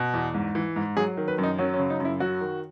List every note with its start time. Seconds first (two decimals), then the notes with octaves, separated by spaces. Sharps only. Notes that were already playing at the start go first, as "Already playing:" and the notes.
Already playing: B2
0.14 E2
0.35 G#2
0.55 E3
0.76 G#2
0.97 F#3 G#4
1.17 D#3
1.28 B4
1.38 F#2
1.43 D#4
1.58 F#3 C#4
1.74 C#4
1.79 C#3
1.90 D#4
2.00 F#2 E4
2.20 F#3 F#4
2.41 D#3